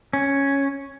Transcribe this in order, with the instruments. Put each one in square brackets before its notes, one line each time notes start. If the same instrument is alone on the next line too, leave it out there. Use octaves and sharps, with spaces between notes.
[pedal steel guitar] C#4